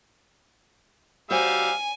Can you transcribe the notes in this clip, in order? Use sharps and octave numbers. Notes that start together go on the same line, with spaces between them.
G3 F#4 C5 C#5 F5 G#5 E6